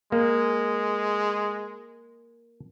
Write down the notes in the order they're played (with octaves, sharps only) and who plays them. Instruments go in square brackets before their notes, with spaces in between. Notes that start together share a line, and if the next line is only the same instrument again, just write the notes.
[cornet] G#3 [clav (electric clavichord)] A#3